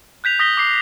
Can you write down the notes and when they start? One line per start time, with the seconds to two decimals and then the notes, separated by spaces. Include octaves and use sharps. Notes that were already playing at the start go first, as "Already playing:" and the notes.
0.24 F#6 G6 B6 F7
0.39 D#6 A#6 B6 G7
0.57 D6 C7